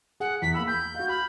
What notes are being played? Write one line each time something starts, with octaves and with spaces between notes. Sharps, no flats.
G#4 F#5
E2 B6
A#3 B5 E6
G6 B6
F#4 F5
B5 F6